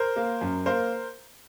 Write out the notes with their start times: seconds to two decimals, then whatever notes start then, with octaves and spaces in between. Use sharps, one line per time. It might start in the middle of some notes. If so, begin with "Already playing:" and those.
Already playing: A#4 C5
0.16 A#3
0.41 F#2
0.66 A#3 A#4 C5